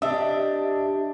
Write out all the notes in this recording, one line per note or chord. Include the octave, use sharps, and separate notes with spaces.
D4 G4 D#5 E5